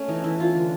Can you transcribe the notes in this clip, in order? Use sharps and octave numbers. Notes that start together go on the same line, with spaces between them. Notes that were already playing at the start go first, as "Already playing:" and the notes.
Already playing: A3 C#4
E3 D#4
E3 E4
E3 F4
D3